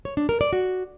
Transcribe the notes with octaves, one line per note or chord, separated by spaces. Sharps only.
C#5
D4
A#4
D5
F#4